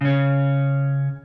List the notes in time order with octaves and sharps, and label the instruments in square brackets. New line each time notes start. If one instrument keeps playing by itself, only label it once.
[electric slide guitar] C#3 C#4